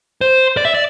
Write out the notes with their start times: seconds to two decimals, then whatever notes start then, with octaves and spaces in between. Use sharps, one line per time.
0.21 C5
0.57 D5
0.65 E5
0.74 D5